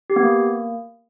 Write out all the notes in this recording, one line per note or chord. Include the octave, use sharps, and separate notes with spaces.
G4
B3
A#3